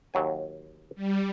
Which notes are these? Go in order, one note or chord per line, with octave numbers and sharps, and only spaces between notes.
D#2 F#3 G#5
G3